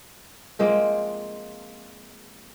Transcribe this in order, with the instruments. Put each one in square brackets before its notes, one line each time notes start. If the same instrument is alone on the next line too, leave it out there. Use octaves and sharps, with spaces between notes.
[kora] F3 G#3 A#3 C4